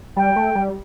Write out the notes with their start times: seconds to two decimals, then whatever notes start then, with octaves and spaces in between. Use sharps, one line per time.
0.16 G3 G5
0.36 A3
0.55 G3